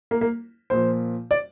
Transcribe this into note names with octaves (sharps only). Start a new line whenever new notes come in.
A#3
A#3
A#2 F3 C5
D5